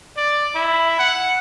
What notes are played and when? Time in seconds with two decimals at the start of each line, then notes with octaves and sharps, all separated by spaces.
0.17 D5
0.55 E4
0.99 F#5